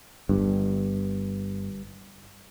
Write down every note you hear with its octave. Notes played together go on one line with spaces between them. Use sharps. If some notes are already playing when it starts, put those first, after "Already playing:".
G1 G2